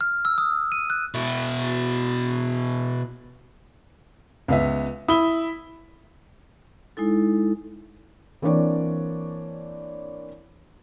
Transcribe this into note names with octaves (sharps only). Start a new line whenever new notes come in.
F6
E6
D#6
D#7
F#6
B2 E4
C#2 B3 E5
E4 D#6 G7
G#3 D#4 E4 A4
E3 A#3 C4 D4 C#5 D5